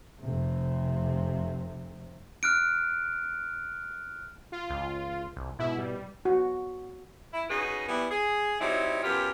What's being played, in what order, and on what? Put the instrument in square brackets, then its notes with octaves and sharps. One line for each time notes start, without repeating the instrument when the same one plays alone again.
[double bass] F1 C3
[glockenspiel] F6 F#6 D7
[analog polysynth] F4
[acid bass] C#2
C2
[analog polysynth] G#2 E4 [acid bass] B2
[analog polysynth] G3
[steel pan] F#4
[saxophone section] E4
C#3 D#4 F#4 G#4 B4
E3 G3 B3
G#4
F#3 G3 C4 D#4 E4
F#2 B3 F4 G4